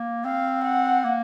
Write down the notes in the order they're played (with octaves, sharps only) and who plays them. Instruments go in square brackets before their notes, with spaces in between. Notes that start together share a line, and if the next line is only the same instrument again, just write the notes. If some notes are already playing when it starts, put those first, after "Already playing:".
Already playing: [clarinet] A#3
[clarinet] C4 [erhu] F5
[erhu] F#5
[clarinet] A#3